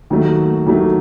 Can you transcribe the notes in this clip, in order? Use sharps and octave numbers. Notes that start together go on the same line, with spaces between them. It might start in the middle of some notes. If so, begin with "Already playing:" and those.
D#2 D#3 F#3 A3
D#2 D#3 F#3 A3